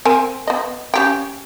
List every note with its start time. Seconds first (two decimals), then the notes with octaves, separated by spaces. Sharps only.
0.05 C4 A#4 G#5
0.47 B3 D#5
0.94 C#4 G4 G5